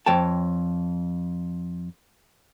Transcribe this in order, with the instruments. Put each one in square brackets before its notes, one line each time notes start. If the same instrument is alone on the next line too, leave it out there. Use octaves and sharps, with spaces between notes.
[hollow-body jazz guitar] F2 C#5 G5 A5